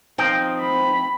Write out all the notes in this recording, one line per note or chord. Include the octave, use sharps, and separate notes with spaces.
F3 C4 D#4 G5
B5